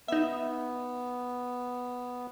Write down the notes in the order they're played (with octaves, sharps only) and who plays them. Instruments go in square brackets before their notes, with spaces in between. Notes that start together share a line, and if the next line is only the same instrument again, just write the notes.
[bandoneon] B3 [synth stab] D#4 E5